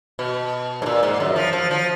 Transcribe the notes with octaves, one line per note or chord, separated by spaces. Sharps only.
B2
G#2
A#2
G#2
F#2
F3
F3
F3